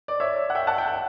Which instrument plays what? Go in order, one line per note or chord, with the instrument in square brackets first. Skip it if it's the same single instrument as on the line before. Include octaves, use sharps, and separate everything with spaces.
[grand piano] D5
C#5 E5
F#5
E5 G5
F#5 A5
G5
F#5